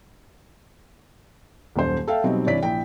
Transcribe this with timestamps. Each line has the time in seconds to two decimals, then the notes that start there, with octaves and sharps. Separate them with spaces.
1.76 D#1 F#2 C5
2.08 A4 E5 F5 G5
2.24 B2 F#3 G3 C4 D#4
2.46 G2 C3 E3 C#5 D5 B6
2.63 A#1 E4 G5